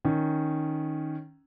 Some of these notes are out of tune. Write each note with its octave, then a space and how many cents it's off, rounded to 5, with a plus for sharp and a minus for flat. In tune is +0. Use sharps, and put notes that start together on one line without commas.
D#3 +0 C#4 +0